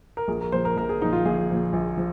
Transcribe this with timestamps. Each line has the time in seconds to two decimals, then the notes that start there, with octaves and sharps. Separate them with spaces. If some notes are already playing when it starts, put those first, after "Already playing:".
0.17 A#4
0.28 A#1 G#4
0.41 A#4
0.52 A#2 F3 C5
0.65 A#4
0.76 A#1 A#4
0.89 G#4
1.01 A#2 F3 D#4
1.13 F4
1.25 A#1 G#4
1.50 A#2 F3
1.73 A#1
1.97 F3